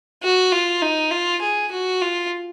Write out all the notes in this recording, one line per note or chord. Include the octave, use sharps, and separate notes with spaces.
F#4
F4
D#4
F4
G#4
F#4
F4